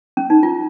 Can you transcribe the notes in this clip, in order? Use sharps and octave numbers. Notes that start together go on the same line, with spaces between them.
C#4
D#4
F4